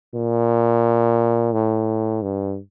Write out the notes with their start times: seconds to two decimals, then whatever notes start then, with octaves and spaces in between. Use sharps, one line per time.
0.14 A#2
1.53 A2
2.22 G2